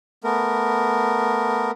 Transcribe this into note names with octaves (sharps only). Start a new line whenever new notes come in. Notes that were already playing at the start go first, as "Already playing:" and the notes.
A3 B3 A#4